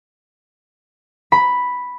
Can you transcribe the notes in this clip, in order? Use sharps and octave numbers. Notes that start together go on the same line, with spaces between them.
B5